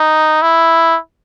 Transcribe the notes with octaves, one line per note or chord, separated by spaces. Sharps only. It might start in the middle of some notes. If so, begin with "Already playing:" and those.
Already playing: D#4
E4